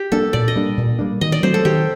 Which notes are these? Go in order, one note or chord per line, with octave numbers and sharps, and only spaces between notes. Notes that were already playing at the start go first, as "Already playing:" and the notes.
Already playing: G4
G3 A#3 D4 A4
A#2 D5
D#5
G3 A#3 D4
A#2
G3 A#3 D4
D#3 D#5
D5
F#3 A3 C4 C5
A4
D#3 G4